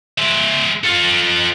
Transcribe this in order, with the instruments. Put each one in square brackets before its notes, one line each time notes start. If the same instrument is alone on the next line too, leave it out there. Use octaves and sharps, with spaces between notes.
[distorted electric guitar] G#3 E5
F4 A4